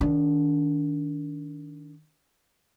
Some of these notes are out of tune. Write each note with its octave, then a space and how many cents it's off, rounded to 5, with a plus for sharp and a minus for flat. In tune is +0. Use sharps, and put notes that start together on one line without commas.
D#3 +0 D4 -30